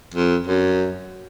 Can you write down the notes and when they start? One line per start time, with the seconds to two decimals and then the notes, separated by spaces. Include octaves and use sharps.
0.14 F2
0.46 F#2